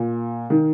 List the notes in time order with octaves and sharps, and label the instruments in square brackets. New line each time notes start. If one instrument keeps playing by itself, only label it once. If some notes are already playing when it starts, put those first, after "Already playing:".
Already playing: [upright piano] A#2
D#3